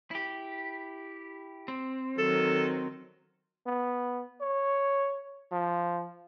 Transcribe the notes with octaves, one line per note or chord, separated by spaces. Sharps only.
E4 G4
C4
D#3 F#3 A4
B3
C#5
F3